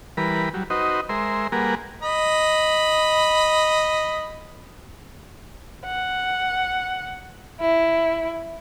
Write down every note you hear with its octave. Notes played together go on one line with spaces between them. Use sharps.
E3 G3 A#4 B4 B5
F#3 G3
D#4 F#4 B4 C5 D#5
G#3 A#4 C5 E5 C6
G3 A#3 G#4 A#4 B4 F#5
D#5 B5
F#5
E4